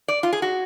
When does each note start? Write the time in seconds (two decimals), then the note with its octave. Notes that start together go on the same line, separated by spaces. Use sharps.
0.08 D5
0.23 F4
0.33 G#4
0.42 F#4